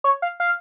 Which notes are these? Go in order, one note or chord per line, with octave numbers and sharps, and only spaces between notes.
C#5
F5
F5